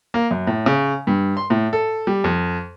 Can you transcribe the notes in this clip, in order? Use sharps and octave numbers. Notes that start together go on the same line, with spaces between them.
A#3
F#2
A2
C#3
G2
C6
A2
A4
G3
F2